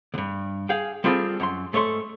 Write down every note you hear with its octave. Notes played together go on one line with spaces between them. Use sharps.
D2 G2
G#4 F5 G5
G3 C4 F4 G#4 A4
F#2 A#5 C6
G#2 A3 C#5 D5 C6